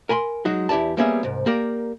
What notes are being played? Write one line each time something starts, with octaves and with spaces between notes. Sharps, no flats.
A#4 G#5 B5 C6
F#3 G#3 D#4 F#4
E2 E4 G4 D5 A5
G3 A#3 B3 C#4 G#4 E5
C2 G#2
A#3 G4 A#4 D5